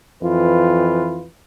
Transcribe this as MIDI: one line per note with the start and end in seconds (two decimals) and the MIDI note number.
0.23 1.27 41
0.23 1.27 52
0.23 1.27 65
0.23 1.27 71